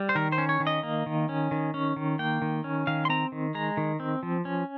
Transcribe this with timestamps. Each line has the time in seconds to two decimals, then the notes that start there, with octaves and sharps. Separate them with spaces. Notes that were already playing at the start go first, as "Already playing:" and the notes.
Already playing: G3
0.09 C5
0.15 D#3 A#4
0.32 C5
0.38 C#4
0.49 C#5
0.60 D#3
0.67 D#5
0.83 A#3
1.06 D#3
1.29 C#4
1.51 D#3
1.74 C#4
1.96 D#3
2.19 A#3 G5
2.42 D#3
2.64 C#4
2.87 D#3 F5
3.05 C6
3.09 C4 A#5
3.32 D#3
3.55 G#3 A#5
3.77 D#3
4.00 C4
4.23 F3
4.45 C#4